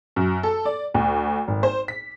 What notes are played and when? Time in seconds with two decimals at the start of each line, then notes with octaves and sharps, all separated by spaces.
0.16 F#2
0.43 A4
0.65 D5
0.94 D2
1.48 G#1
1.63 C5
1.88 B6